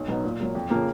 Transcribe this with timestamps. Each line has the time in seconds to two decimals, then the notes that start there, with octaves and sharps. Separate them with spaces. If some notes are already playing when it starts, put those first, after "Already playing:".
Already playing: B1
0.08 B2 F#3 B3 D#4
0.24 A#2
0.40 F#3 A#3
0.55 F2
0.70 C#3 F3 A#3